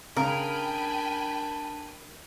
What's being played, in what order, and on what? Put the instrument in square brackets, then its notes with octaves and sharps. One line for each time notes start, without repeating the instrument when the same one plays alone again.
[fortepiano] C#3 A#5 [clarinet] D4 [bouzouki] A#4 [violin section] G5 G#5 B5